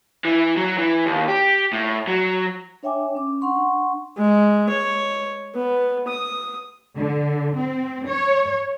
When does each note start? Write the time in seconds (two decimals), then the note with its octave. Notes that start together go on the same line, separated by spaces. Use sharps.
0.25 E3
0.57 F#3
0.78 E3
1.06 D#2
1.28 G4
1.73 A2
2.07 F#3
2.83 D4 C#5 E5 G5 G#5 D6
3.15 C#4 D6
3.41 D4 F#5 C6 C#6
4.18 G#3
4.70 C#5
5.55 B3
6.08 D#6
6.97 D3
7.57 C4
8.07 C#5